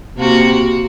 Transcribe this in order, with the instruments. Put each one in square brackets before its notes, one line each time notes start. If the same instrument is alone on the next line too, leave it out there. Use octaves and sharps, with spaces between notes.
[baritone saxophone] C3 [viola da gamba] A#3 F#4